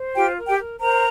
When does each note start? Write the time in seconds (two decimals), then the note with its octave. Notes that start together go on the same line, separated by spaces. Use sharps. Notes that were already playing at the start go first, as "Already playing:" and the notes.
Already playing: C5
0.15 F4 G4 G5
0.37 A#4
0.47 G4 G5
0.59 A#4
0.80 A#4 C5 A#5